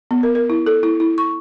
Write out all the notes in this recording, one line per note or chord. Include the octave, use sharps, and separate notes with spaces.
B3
A#4
A#4
E4
A4
E4
E4
C#6